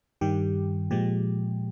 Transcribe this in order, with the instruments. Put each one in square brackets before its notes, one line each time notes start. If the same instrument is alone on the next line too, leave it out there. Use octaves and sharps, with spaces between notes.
[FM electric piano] G2 D#3 G3 G4
A#2 F3 G#3 G4